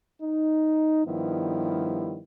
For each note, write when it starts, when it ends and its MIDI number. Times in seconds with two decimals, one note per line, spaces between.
0.22 1.05 63
1.06 2.20 43
1.06 2.20 51
1.06 2.20 53
1.06 2.20 55
1.06 2.20 59
1.06 2.20 64